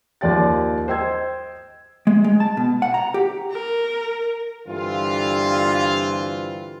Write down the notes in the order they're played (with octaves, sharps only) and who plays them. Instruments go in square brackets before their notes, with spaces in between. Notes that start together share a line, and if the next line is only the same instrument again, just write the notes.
[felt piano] D#2 F3 D5 G5 A6
C5 D#5 G5 E6 G#6
[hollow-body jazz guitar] G#3
G#3
A5
B2
F#5
A#5
G4
[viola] A#4
[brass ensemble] G2 D3 E3 C4 F4